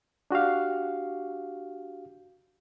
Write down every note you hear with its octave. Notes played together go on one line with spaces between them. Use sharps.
D4 F#4 G4 F5